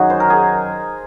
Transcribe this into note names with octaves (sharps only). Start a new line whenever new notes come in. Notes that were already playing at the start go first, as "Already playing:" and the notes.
Already playing: F#2 D#3 F#3 D#4 F#4 G#4
C5
A#4
G#4